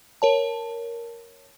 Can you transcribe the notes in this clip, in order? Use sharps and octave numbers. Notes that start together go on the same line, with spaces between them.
A#4 C#5 A5